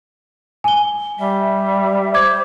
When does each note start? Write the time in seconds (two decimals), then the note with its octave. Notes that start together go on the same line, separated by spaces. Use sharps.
0.64 G#5 G7
1.20 G3 E5
2.14 C5 D6 G#6